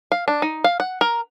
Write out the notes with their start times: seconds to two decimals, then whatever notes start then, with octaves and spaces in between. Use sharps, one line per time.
0.12 F5
0.28 D4
0.42 D#4
0.64 F5
0.80 F#5
1.01 A#4